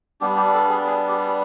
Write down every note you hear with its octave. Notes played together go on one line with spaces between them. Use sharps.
G3 B3 D4 G4
G4
A4
G#4
G#4
G4